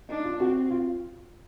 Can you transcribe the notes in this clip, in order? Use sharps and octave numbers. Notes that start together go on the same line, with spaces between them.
D4 D#4
F4
C4 F#4
F4